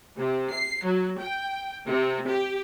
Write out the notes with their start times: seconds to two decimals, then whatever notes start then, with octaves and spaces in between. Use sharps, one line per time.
0.18 C3
0.53 C7
0.85 F#3
1.20 G5
1.87 C3
2.29 G4